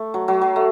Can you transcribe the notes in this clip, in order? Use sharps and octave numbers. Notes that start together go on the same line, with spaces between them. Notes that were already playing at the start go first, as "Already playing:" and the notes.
Already playing: A3
F#3
F#3
F#3
A3